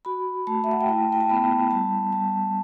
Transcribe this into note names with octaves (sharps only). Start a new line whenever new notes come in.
F#4 B5
A3 A5
E5
F#5
G5
E4 A5
G5
A5
B3 B5
G3 A5
G3 A5